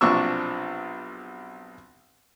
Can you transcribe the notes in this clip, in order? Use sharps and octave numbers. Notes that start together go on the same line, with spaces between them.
B1 C3 F3 D4 C#6 E6